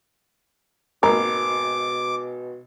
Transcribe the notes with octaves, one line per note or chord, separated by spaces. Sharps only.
G#1 B2 A#3 A#4 D6